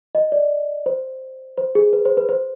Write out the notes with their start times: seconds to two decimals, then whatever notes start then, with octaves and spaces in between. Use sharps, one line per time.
0.15 D#5
0.32 D5
0.86 C5
1.57 C5
1.75 G#4
1.93 B4
2.05 C5
2.17 B4
2.29 C5